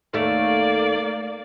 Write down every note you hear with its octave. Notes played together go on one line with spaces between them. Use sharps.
D#2 A3 A#3 D5